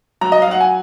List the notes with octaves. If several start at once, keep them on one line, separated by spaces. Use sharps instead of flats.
F#3 A#5
D#5
F5
F#3 F#5
G#5